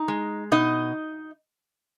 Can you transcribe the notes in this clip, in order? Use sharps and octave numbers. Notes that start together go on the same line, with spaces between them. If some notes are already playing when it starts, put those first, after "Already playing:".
Already playing: D#4
G#3
B2 D#4 D#5